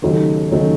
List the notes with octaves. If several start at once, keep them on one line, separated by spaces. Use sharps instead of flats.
D#2 C#3 F#3 A3 D#4
D#2 C#3 F#3 A3 D#4